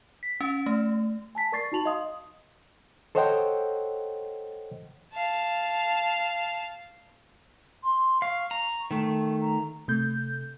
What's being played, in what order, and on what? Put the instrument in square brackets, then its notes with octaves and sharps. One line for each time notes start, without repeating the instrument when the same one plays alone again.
[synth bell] B6
C#4
A3
[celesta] G#5 A5 B6
A#4 D5 C#6 A6 C7
D#4 F#4 A5 F7 F#7
D#5 F5 C6 D#6
[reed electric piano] A4 C5 C#5 D#5 F#5 G5
[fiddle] F5 A5
[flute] C6
[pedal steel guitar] F5 [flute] C#6
[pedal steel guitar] A#5
D#3 A3
[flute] A#5
[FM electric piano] C3 A3 G6